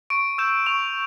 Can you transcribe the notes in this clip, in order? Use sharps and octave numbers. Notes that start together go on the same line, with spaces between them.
C#6 D7
E6 G6 E7
C#6 F7